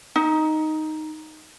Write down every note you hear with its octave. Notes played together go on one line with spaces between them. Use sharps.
D#4